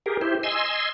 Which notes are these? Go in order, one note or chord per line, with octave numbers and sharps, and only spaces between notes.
G4 G#4 A#4
E4 G4 C5
D#5 G#5 C6 E6